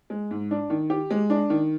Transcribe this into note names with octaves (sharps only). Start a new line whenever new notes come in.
G#3
G#2
D4
D#3
G4
G#3
D4
D#3